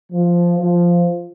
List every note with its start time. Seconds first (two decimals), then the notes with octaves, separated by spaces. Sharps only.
0.12 F3
0.59 F3